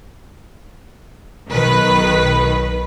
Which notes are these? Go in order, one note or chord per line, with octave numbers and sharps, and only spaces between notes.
B1 D#3 B4